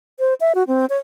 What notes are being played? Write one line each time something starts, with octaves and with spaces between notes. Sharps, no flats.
C5
E5
F#4
C4
C#5